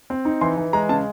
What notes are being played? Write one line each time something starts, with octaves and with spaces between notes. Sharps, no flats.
C4
D#4
E3 C6
E3
G#3 A#5
C#3 A5